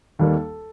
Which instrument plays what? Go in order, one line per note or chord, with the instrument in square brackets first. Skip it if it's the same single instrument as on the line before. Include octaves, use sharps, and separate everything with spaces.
[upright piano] D#2 D#3 G3 A#3 A4